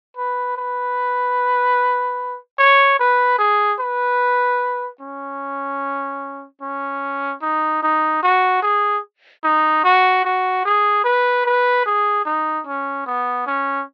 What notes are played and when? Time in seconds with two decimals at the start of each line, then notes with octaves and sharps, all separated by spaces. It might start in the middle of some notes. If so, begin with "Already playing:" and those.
0.17 B4
0.57 B4
2.59 C#5
2.99 B4
3.39 G#4
3.80 B4
5.01 C#4
6.62 C#4
7.42 D#4
7.83 D#4
8.23 F#4
8.63 G#4
9.44 D#4
9.84 F#4
10.24 F#4
10.65 G#4
11.04 B4
11.46 B4
11.86 G#4
12.25 D#4
12.67 C#4
13.06 B3
13.47 C#4